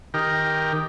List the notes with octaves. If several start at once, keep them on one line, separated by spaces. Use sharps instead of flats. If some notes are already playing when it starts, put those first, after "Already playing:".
D#3 G4 A#4